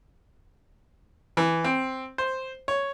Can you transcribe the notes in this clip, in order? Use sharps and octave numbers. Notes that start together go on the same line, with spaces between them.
E3
C4
C5
C#5